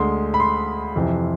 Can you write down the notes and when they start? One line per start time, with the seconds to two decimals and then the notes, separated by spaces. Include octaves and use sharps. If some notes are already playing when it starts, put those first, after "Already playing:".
Already playing: D2 D3 G#3 C6
0.34 B5
0.40 C6
0.96 F2 C3 E3